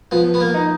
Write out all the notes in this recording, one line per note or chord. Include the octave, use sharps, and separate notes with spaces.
F3 B3
B3
A#3
D#4